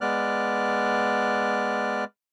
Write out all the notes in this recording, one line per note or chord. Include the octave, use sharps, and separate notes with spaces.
G#3 B3 D5 F6 F#6